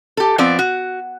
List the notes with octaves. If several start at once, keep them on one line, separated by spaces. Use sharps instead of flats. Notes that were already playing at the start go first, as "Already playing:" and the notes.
G4 A4
F3 B3 C4 D5
F#4